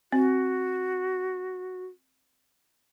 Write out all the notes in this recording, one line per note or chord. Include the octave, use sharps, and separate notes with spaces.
C4 F#4